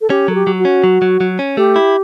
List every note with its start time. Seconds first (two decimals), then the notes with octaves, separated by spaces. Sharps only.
0.01 A4
0.10 C#4 G4
0.28 F#3 A4
0.34 G4
0.47 F#3
0.59 F#4
0.65 C#4
0.84 F#3
1.02 F#3
1.21 F#3
1.39 C#4
1.57 A3 G4
1.76 E4